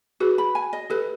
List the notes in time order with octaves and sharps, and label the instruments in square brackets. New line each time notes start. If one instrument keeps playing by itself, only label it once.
[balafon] F#4 G#4 [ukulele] B4
[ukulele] B5
G#5
D#5
[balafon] G4 A4 [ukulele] B4